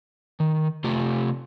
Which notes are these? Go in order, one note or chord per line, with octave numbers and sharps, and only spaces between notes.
D#3
C3 A3 F4 G4